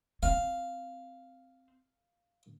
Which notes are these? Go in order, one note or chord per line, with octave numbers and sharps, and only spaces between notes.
C4 F5